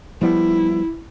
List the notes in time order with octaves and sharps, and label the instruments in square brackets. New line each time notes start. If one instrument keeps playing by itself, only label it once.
[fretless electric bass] F3 G3 B3 [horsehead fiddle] E4